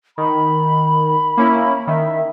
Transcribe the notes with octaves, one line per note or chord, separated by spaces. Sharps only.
D#3 B5
A#3 C#4 E4
D#3 E5